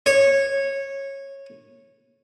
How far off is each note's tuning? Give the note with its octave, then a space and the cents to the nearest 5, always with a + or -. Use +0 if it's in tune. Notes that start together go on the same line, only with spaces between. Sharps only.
C#5 -15